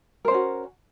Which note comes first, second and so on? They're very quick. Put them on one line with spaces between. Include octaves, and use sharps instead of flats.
A#4 C5 C#4 F#4